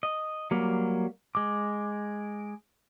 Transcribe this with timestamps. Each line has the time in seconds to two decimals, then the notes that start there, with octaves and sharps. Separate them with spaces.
0.03 D#5
0.51 F#3 G3 A#3
1.35 G#3 D6